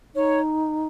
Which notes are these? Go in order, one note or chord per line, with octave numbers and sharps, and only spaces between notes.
D#4 C#5